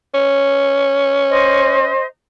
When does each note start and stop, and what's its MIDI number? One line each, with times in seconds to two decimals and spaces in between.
0.14 1.89 61
1.30 2.05 72
1.30 2.05 75